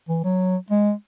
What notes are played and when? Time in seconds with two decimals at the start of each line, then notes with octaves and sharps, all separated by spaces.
0.09 E3
0.24 F#3
0.70 G#3